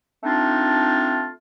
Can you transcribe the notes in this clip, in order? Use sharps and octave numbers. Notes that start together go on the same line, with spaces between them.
A3 C4 D4 D#4 F4